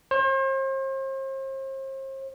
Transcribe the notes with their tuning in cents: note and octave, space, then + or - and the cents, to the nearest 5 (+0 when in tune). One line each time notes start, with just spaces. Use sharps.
C5 +40